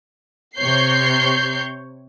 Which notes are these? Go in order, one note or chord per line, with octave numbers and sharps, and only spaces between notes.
C3 C#5 G6 C7